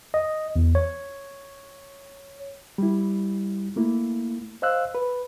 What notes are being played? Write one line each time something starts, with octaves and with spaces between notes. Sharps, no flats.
D#5
E2
C#5
G3 E4
A3 A#3 E4
C5 D#5 F5 E6 F#6
B4